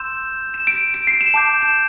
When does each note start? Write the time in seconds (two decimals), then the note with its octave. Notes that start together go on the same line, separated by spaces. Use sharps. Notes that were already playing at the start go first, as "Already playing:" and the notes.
Already playing: C6 E6 G6 E7
0.54 E7
0.67 D7
0.94 D7
1.07 C7
1.21 E7
1.34 A5 D6 G6
1.62 E7